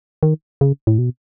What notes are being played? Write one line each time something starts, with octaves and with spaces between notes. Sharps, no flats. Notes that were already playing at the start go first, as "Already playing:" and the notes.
D#3
C#3
A2
B2